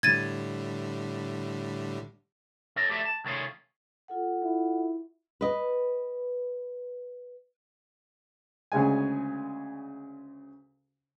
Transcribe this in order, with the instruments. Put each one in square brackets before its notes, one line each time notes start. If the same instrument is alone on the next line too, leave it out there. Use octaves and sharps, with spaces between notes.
[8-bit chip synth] A2 D3 G3 [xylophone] G#6 A6 D#7
[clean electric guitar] C#4 A4 D#5
A3 G4 A4 B4 D5 E5
A5
C2 D#3 A3 C#4 F4 G#4
[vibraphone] F4 A4 F#5
[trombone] E4
[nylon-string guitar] B4 D#5
[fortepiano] D2 C#3 G#3 G#5